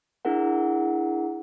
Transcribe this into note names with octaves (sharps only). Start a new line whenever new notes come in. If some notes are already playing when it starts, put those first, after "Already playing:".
D4 E4 G#4 A#4 F#5